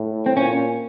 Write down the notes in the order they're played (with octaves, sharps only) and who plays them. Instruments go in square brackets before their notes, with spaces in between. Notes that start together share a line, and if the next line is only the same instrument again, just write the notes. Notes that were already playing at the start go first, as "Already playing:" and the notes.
Already playing: [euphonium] A2
[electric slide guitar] C4
[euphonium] A#2 [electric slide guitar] C#4